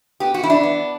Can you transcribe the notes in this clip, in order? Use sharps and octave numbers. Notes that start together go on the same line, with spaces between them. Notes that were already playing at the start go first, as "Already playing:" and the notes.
B3 G4
F#4
E3 E4
D4
B3